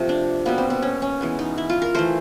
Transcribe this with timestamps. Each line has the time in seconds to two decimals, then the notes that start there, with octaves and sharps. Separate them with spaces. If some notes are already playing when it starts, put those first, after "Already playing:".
Already playing: C3 F3 A3
0.09 D4
0.45 B2 G3 A#3 B3
0.58 C4
0.70 C4
0.82 C#4
1.02 C#4
1.21 E3 G#3 B3
1.39 D#4
1.58 E4
1.70 F4
1.82 A#4
1.95 E3 A3 C5